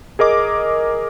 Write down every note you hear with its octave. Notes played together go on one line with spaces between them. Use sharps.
G#4 A#4 D#5 D6